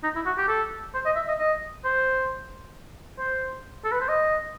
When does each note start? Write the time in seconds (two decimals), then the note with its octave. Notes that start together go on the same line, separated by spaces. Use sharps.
0.03 D#4
0.15 E4
0.26 F#4
0.38 G4
0.48 A4
0.94 C5
1.05 D#5
1.16 E5
1.28 D#5
1.39 D#5
1.84 C5
3.18 C5
3.85 A4
3.92 B4
4.01 C5
4.08 D#5